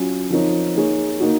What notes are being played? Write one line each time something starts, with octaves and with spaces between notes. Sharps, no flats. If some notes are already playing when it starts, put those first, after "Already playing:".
Already playing: F#3 C#4 F4
F3 C4 D#4 A#4 C#5
A#3 D#4 G#4 C#5
A#3 D#4 F#4